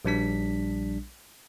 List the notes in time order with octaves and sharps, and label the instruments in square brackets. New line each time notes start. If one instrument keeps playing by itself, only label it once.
[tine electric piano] A#1 G3 D4 B6